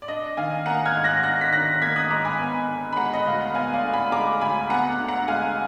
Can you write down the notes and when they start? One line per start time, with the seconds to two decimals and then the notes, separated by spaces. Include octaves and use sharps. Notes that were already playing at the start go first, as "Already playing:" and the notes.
0.02 D5
0.08 D4 D#5
0.37 D#3 F5 G#5
0.66 A#3 F#5 A#5
0.86 F6 G#6
0.95 G#2
1.04 F#6 A#6
1.23 D4 F#6 A#6
1.41 B6
1.52 D#3 F#6 A#6
1.82 A#3 G#6 B6
1.96 D#6 F#6
2.10 G#2 A#5 D6
2.24 G#5 B5
2.39 B3
2.68 D3
2.93 B5
2.96 G#3 F#5 A#5
3.13 D#5
3.26 D2 F5
3.41 F#5
3.54 B3 F5 G#5
3.73 D5 F5
3.83 D3
3.93 G#5 B5
4.12 G#3 A#5 D6
4.41 D2 G#5 B5
4.70 B3 F#5 A#5
4.99 D3
5.08 F#5 A#5
5.28 G#3 F5 G#5